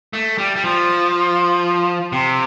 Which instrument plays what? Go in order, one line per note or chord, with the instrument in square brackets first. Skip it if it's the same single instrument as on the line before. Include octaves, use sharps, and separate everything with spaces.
[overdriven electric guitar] A3
G3
G3
F3
C3